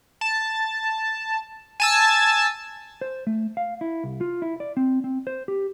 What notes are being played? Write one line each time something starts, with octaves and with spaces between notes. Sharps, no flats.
A5
G#5 A5 E6
C5
A3
F5
E4
C2
F4
E4
D5
C4
C4
C5
G4